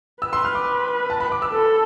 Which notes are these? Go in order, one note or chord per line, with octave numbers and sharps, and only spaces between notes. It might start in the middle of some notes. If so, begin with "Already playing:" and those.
B4 E6
C6
F6
D6
A5
B5
D6
E6
A4